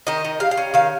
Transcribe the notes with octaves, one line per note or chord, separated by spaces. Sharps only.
D#3 D#5
D#3
G3 F5
F5
C#4
D#3 F5